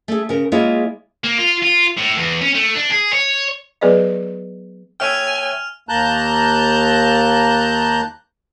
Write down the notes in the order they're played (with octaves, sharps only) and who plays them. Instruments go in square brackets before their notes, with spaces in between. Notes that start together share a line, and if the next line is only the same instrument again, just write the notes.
[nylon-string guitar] A3 G#4
C#3 A#4
G#3 A#3 E4 F4 G#4 C#5
[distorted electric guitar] A#3
F4
F4
A2
E2
C#4
A3
D4
G#4
C#5
[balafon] F#3 B3 G#4 B4 D5 D#5
[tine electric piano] C#5 E5 G5 [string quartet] G#5 [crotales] F6 F7
[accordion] D#2 A#3 A5 A#5 F#6 G6